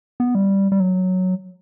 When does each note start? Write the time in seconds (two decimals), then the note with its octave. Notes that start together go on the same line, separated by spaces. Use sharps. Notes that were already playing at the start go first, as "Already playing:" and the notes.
0.20 B3
0.35 G3
0.72 G3
0.80 F#3